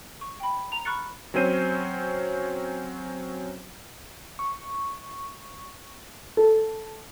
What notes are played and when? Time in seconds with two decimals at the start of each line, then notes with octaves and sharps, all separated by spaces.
0.21 C#6
0.40 G5 B5
0.72 A#5 F7
0.85 B5 C#6 F6 F#6 A6 C#7
1.34 F#3 C4 C#4 C5 D#7
4.39 C#6
6.37 A4